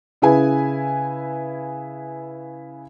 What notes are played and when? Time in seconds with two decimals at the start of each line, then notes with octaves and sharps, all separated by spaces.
0.22 C#3 E4 G#4 B4 G#5